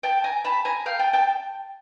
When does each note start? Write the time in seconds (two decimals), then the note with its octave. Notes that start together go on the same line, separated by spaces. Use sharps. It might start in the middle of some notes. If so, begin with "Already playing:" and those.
0.03 G5 A5
0.24 G#5 A#5
0.44 A5 B5
0.65 G#5 A#5
0.86 F5 G5
0.99 G5 A5
1.13 G5 A5